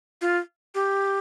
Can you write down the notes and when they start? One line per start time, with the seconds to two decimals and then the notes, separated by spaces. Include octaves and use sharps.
0.21 F4
0.75 G4